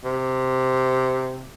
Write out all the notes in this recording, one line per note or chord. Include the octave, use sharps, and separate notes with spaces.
C3